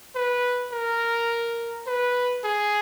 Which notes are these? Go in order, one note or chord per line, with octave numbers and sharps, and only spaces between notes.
B4
A#4
B4
G#4